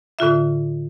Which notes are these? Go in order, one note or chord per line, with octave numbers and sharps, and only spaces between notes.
A2 D3 F4 E5